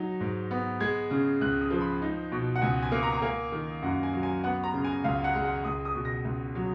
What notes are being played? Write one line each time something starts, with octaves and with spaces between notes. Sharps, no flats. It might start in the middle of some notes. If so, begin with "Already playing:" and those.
Already playing: F#3 D#4
G#2
B3
G#3 G#6
C#3
C#2 F#6
D#6
F3
B5
D#4
B2
F#5
C#2 G#5
G#5
A#3
A#5
A#5
A#3 G#5
D#3
F#2 F#5
G#5
F#3
G#5
B3 F#5
A#5
C#3
G#5
C#2 F5
F#5
G#3
F#5
C#2 D#6
D#6
B2
A#6
C#2
F#3